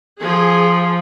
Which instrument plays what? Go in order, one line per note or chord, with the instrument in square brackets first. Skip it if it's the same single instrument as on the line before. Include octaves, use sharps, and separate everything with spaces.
[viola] F3 [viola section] G#4